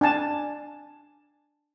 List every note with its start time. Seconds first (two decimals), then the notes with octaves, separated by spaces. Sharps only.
0.01 D4 G#5 A5